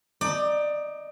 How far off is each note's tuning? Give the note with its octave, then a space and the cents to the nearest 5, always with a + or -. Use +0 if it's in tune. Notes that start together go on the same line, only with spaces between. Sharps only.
D#4 +0 D5 +20